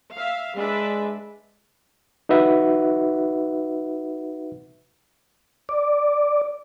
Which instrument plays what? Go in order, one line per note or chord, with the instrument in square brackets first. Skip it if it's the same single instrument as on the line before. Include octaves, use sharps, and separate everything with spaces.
[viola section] E5 F5
[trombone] G#3 [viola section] D4 B4 E5
[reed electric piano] D#4 F#4 B4 E5 F#5
[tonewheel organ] D5